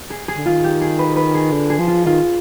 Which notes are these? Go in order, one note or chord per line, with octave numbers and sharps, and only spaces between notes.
G#4
G#4
D3
D#3 F4
G4
G#4
B4
B4
G#4
D3
G#4
F3
F4
D#3 F4